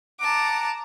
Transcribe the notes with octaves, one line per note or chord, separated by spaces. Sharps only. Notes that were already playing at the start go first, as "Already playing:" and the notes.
F#5 A5 A#5 D6